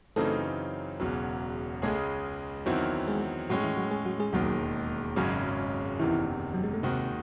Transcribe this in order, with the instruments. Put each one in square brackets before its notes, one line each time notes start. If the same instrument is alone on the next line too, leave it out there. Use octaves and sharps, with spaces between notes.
[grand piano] F#2 C#3 E3 C4 D#4 [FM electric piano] A3 A4
[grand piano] E1 E2 C#3 F#3
[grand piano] C#2 C#3 G#3 C#4 G#4 [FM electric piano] A3 A4
[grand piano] E2 D#3 F#3 C4 E4
[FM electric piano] G#3 G#4
[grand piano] A2 G#3 C#4 [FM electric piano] F#3 F#4
[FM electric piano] E3 E4
F#3 F#4
G#3 G#4
F#3 F#4
G#3 G#4
[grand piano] E1 D#2 D#3 G#3 [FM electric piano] F#3 F#4
[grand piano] G#1 F#2 C#3 G#3 C#4 [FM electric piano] F#3 F#4
[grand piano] F#1 E2 C3 D#3 [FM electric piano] E3 E4
[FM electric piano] F#3
G#3
A3
[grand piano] D#2 D#3 G#3 D#4 F#4 [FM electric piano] C3 C4